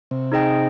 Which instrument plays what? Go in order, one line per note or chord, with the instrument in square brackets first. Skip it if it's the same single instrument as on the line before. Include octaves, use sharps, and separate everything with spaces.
[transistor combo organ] C3
[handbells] D#4 G#4 D#5 G5